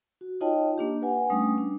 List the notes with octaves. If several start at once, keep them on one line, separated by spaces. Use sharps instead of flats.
F#4
D#4 F4 C#5 D#5 G5 A5
A#3 D4 G4
B4 F#5 G#5
G3 A3 C#4 D4 D#6
D4